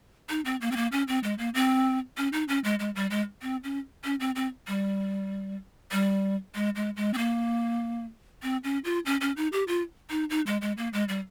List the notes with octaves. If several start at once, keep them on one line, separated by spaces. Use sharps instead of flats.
D#4
C4
A#3
C4
A#3
C#4
C4
G#3
A#3
C4
C#4
D#4
C#4
G#3
G#3
G3
G#3
C4
C#4
C#4
C4
C4
G3
G3
G#3
G#3
G#3
C4
A#3
C4
C#4
F4
C#4
C#4
D#4
G4
F4
D#4
D#4
G#3
G#3
A#3
G#3
G3